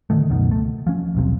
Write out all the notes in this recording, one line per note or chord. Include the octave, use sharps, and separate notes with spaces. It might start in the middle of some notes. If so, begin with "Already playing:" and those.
A2 D3 D#3 A3
C#2 F#2 B2 D#3
A3
F3 C#4
D#1 B1 C3